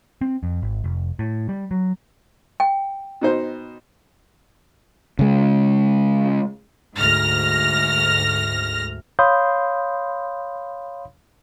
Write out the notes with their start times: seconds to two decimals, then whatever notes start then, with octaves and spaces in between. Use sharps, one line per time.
0.21 C4
0.43 F2
0.62 G#1
0.84 F1
1.19 A2
1.49 G3
1.71 F#3
2.60 G5
3.21 B2 D#4 C5
5.19 C#3 G#3
6.97 D2 G#2 F6 A#6
9.19 C#5 F5 B5 C6 D#6 G6